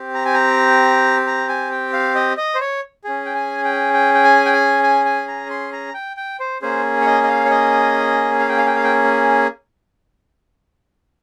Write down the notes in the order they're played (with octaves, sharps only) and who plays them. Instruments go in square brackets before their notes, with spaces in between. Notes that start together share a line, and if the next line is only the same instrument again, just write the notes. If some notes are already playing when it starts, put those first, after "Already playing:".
Already playing: [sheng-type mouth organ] C4 G4
A#5
G#5
A#5
A#5
G#5
G5
F5
D#5
D#5
C5
C#5
C#4 G#4
G5
G#5
G5
G5
G5
G#5
G5
G#5
G#5
G#5
A#5
C6
A#5
G5
G5
C5
A#3 C#4 G#4 C5
C#5
D#5
D#5
F5
C#5
D#5
F5
G5
F5
G5
F5
G5